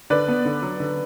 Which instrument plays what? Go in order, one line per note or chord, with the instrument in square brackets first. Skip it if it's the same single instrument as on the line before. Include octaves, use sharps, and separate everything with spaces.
[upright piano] D3 B4 D5
B3
D3
F#3
D3